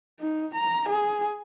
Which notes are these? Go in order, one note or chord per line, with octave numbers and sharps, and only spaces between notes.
D#4
A#5
G#4